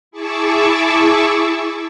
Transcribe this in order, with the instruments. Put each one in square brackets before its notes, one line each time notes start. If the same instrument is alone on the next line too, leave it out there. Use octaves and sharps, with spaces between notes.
[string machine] E4 G#4 A5 C#6 D6 E6